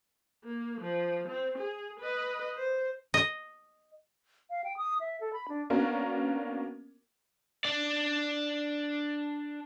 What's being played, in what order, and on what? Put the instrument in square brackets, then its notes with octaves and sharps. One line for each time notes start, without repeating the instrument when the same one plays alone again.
[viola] A#3
F3
C4
G#4
B4 D#5
C5
[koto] D#5
[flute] F5
G5
D#6
E5
A4
B5
D4
[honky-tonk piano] A#3 B3 C#4 D4 F#4 A#4
[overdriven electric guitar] D4 D5